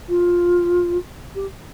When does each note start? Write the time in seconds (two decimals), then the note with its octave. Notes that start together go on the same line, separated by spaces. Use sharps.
0.09 F4
1.35 G4